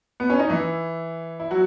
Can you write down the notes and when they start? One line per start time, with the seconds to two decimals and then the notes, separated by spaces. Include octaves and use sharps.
0.20 B3
0.30 C#4
0.40 D#4
0.50 E3 E4
1.40 E4
1.51 F#3 F#4